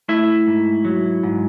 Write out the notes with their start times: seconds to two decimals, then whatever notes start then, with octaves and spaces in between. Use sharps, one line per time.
0.09 A3 E4 E5
0.47 G#2
0.85 F#3
1.23 G#2